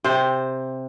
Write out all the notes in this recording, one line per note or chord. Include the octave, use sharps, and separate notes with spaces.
C3 C5